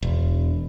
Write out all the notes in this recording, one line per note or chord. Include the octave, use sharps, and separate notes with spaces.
E1